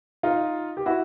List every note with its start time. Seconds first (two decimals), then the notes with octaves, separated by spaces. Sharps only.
0.23 D#4 F4
0.77 G4
0.86 E4 F#4